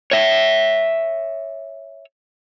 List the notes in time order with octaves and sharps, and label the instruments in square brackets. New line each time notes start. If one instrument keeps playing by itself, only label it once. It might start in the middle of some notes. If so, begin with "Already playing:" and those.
[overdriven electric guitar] C#5 E5